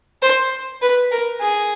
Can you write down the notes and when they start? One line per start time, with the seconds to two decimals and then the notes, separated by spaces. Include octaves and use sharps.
0.22 C5
0.82 B4
1.11 A#4
1.41 G#4